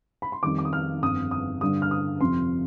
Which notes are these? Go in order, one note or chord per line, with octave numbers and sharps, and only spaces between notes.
B5
C6
F2 D#3 G3 D6
D6
D#6
F6
G1 F2 D3 D#6
D#6
G2 D3 G3 D#6
F6
D#6
F2 C3 F3 C6